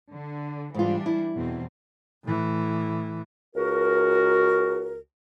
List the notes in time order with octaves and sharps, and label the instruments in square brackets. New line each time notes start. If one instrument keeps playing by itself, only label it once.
[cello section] D3
[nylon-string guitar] G#2 F4 [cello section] E3 G3 D4
[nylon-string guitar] E4
[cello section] E2 B2 C4
[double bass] A2 E3
[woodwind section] C#2 F#4 A#4